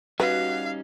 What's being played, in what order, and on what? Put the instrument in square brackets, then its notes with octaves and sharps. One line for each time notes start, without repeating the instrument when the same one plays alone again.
[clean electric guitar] G3 C#4 D#4 [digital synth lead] F#4 [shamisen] B4 [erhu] F5